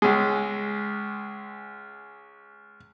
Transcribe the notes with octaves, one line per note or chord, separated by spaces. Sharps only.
C#2 G#3